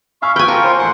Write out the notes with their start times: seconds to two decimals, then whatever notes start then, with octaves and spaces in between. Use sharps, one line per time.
0.22 E5 F5 G#5 B5 C#6 F6
0.36 B4 G5 G#5 B5 F6 G6
0.48 F4 G4 A#4 G#5 A5 C#6
0.64 C5 C6
0.79 A1 A4 F#5 G#5 C6 F#6